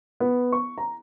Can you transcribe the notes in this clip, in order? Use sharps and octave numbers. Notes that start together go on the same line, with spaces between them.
B3
C#6
A#5